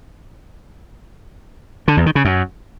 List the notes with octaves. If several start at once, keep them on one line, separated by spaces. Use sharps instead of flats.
D3
E2
D#3
C#3
F#2